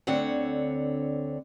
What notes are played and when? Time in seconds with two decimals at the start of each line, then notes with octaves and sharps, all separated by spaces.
0.07 D2 D3 C4 C#5 F#5